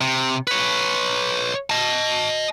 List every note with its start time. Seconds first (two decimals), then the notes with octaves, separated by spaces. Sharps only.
0.01 C3
0.47 B4 C#5
1.70 D#5 A5